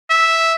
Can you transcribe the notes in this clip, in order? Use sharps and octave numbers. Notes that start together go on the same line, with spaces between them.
E5